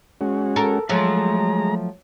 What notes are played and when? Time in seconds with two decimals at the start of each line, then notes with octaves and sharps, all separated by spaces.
0.21 G#3 C#4 F#4
0.56 A4 A#4
0.89 F3 F#3 G#3 A3 A#5